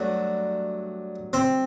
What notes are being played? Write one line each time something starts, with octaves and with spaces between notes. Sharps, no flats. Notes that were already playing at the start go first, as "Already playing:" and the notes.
Already playing: G2 F#3 A3 D4
C4